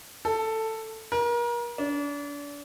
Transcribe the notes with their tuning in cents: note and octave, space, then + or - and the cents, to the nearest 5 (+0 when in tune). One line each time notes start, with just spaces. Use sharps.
A4 +10
A#4 +35
D4 -35